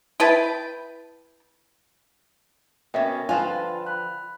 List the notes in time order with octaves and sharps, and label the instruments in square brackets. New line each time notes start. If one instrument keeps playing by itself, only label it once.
[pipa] E4 B4 G5 A5
[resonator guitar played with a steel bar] B2 C#4 [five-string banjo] A#3 E5 [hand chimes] G5
[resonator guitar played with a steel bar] D3 F3 B4 [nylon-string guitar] F4 [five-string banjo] G#5 A5
[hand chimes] B5 F#6